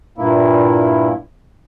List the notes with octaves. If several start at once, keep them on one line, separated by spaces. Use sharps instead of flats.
G2 A#2 A#3 E4